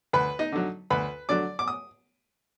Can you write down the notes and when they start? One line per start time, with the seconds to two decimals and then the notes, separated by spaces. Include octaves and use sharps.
0.13 D2 B4 B5
0.39 D#4 D#5
0.52 D3 F#3
0.90 D2 B4 B5
1.29 D3 F#3 D5 D6
1.59 D6
1.68 D#6